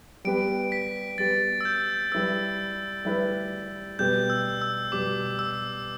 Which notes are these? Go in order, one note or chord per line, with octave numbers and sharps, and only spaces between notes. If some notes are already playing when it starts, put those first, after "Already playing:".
G3 B3 G4 B4 D7
B6
G3 B3 G4 B4 A6
E6
G6
G3 E4 B4 E6
G3 E4 B4
B2 G3 B3 G4 B4 G6
E6
E6
B2 G3 B3 G4 B4 D6
E6